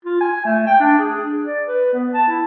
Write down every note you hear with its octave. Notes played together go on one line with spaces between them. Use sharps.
F4
G#5
A3
G5
D4
G#4
D4
D5
B4
B3
A5
E4